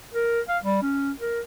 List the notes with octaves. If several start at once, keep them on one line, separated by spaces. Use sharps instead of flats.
A#4
F5
G3
C#4
A#4